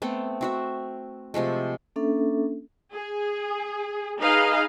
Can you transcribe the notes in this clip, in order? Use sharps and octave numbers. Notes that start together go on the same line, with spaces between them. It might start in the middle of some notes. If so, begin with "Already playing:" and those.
A3 B3 C4
C4 F#4 E5
C3 F3 G#3 A3
A#3 C#4 D4 A4 E5
G#4
D#4 G#4 B4 D#5 F5